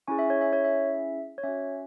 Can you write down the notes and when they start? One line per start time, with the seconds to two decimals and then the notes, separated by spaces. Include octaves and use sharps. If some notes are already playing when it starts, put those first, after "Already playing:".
0.07 C#4 E4 G#4 G#5 C#6
0.19 E5
0.30 C#5
0.41 E5
0.53 C#5
0.64 E5
1.38 C#5
1.43 C#4 F#4 E5